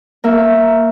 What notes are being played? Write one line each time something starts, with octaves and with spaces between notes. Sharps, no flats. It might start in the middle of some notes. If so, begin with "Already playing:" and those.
A#3 A#4 E5